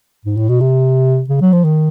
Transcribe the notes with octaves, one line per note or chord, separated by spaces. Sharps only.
G#2
A2
B2
C3
C#3
F#3
F3
D#3